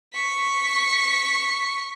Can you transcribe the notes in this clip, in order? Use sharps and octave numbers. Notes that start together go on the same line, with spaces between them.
C#6 B6